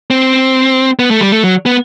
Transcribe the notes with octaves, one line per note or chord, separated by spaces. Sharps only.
C4
B3
A3
G3
A3
F#3
B3